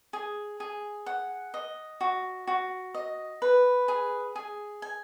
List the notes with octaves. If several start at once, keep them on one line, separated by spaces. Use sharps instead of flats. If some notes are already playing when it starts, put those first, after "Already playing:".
G#4
G#4
F#5
D#5
F#4
F#4
D#5
B4
G#4
G#4
G#5